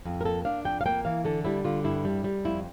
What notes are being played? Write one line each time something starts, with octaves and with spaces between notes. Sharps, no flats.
F2
A#4
A#3 A4
D4 F5
F2 G5
F5
A#3 G5
E3 F5
D3 A4
G3 E4
D3 F4
G2 E4
G3
G3
F2 E4